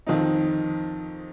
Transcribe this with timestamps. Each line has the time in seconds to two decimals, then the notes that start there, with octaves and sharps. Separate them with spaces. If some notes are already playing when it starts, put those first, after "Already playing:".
0.06 F2 D#3 C4 D#4